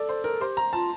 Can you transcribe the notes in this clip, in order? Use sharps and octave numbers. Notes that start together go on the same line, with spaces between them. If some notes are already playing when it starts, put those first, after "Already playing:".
Already playing: A4 D5
C5
A#4
G4 C5
A#5
F4 A5